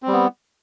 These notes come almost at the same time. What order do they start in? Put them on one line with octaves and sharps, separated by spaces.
C4 G3 B3